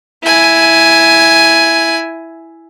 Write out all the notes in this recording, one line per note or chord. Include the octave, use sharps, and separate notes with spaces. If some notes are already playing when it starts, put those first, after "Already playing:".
E4 G#5